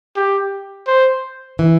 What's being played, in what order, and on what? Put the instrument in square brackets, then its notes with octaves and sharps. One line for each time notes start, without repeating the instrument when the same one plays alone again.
[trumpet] G4
C5
[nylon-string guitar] E3